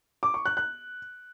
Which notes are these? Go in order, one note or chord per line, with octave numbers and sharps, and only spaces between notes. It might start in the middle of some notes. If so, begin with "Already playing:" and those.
D6
C#6
F#6
F#6